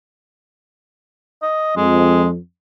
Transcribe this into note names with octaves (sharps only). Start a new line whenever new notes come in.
D#5
F2 G#3